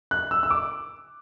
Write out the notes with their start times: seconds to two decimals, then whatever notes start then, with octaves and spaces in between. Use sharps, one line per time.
0.11 F#6
0.31 E6
0.43 E6
0.50 D6